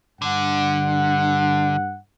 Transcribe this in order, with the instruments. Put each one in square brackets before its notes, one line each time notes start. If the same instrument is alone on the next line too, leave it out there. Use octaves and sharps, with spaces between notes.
[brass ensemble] G2 F#5 [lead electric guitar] D3